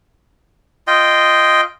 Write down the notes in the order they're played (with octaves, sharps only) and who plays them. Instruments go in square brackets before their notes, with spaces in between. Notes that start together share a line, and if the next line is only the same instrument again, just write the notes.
[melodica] F4 D#5 G5